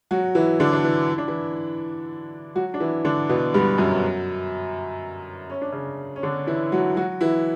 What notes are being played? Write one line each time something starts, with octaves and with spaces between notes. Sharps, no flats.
F#3 F#4
E3 E4
D3 D4
D4
E3 E4
E4
D4
E3 E4
F#3 F#4
D4
E3 E4
D3 D4
B2 B3
G2 G3
F#2 F#3
C#4
D4
C#3 C#4
C#4
D3 D4
E3 E4
F#3 F#4
F#3 F#4
E3 E4